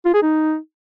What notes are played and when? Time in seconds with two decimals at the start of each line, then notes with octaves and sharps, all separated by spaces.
0.06 F4
0.14 G#4
0.22 D#4